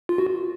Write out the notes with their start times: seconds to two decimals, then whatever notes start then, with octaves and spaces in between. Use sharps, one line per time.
0.09 F4
0.18 F#4